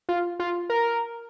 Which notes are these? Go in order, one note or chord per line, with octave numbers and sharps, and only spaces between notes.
F4
F4
A#4